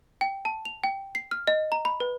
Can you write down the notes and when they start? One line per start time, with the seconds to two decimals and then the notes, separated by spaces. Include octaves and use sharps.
0.21 G5
0.45 A5
0.65 F7
0.84 G5
1.15 C7
1.31 F6
1.47 D#5
1.72 A#5
1.85 B5
2.00 B4